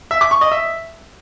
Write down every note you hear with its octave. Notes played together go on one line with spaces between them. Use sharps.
E5
D6
C#6
D#5
E5